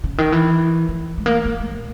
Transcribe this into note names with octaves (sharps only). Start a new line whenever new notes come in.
C#3
D#3
E3
E3
G#3
A#3
A#3
G#3
A#2